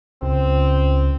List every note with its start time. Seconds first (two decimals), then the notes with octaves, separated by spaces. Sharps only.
0.22 C#2 C4